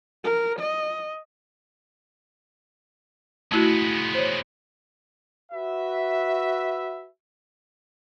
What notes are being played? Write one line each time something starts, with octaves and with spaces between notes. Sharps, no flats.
A#4
D#5
G#3 A3 B3 E4 F#4
C5 C#5
F#4 B4 E5